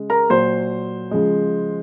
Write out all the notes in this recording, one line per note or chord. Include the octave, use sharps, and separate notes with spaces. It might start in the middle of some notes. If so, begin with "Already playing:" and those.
Already playing: C#3 G#3
A#4 A#5
A#2 F#3 C5 C6
C#3 F3 G#3